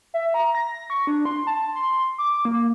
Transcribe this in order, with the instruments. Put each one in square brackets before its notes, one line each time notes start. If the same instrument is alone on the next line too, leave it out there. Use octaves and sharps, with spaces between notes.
[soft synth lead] E5
A#5
A#6
C#6
D4
C6
A5
C6
D6
A#3